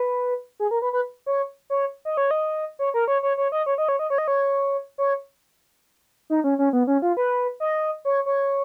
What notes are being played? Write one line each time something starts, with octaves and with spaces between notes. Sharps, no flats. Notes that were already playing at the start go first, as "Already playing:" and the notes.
Already playing: B4
G#4
A#4
B4
B4
C#5
C#5
D#5
C#5
D#5
C#5
A#4
C#5
C#5
C#5
D#5
C#5
D#5
C#5
D#5
C#5
D#5
C#5
C#5
D#4
C#4
C#4
B3
C#4
F4
B4
D#5
C#5
C#5